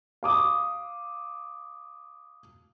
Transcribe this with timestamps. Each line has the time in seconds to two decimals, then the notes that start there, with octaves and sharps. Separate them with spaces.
0.23 F5 D6 D#6